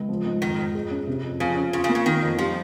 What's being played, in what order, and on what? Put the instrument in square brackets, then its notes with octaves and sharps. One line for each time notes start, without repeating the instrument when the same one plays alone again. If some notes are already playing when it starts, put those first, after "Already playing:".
Already playing: [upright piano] C#2
F3
G#2
[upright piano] F2 [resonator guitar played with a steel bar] D#3
[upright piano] F2
G#4
C#4
C3
F2
[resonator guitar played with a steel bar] C#3 [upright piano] F3
[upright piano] C#4
[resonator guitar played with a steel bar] C#3 [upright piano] F4
[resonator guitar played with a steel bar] C#3
[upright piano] A#3
[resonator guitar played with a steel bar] C#3
[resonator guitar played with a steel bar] D#3 [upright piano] A#3
[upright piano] F2
[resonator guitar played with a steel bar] F3 [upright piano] G3